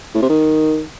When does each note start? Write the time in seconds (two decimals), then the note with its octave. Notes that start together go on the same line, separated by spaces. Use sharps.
0.15 A2
0.22 C3
0.29 D#3